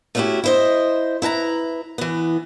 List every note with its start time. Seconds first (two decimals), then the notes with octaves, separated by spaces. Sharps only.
0.15 A3 C#4 D#4 E4 F#4 G4
0.44 E4 C5 D#5
1.22 E4 B4 G#5 A#5
1.98 E3 B3